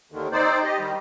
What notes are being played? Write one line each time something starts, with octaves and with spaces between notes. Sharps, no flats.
D#2 D3 D#3
C4 D#4 C5 D5
G4 D#5
D#3 G3